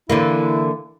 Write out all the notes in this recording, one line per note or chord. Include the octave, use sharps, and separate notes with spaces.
D3 E3 A#3 E4